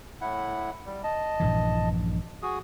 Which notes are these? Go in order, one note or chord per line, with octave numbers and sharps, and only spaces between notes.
A2 E4 F#5
G3
D#5 A5
A#1 G2 E3
F#4 G#4 D#6